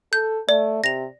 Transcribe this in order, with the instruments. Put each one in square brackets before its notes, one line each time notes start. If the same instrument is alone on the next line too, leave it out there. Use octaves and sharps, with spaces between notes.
[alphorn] A4 [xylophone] G6
[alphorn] A3 [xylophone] D5
[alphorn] C3 [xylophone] A#6 F7